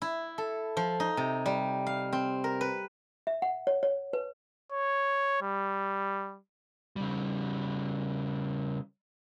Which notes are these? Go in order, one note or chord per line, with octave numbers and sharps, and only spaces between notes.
E4
A4
F3
D#4
C3
G3
F5
C4
A#4
B4
E5
F#5
C#5
C#5
B4
C#5
G3
C#3 G3